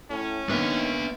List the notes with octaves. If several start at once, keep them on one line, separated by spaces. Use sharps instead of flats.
A2 C#4
D#3 A#3 B3 D4 E5